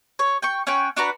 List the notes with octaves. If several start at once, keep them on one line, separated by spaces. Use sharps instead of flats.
C#5
G5 C#6
C#4 C#5 F#5 G5
D4 F#4 B4 A#5